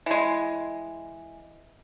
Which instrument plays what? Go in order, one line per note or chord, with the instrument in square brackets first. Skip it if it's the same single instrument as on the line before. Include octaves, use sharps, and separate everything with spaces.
[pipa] E3 G#3